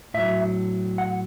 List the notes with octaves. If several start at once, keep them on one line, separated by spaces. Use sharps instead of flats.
A2 F#3 E5
F#5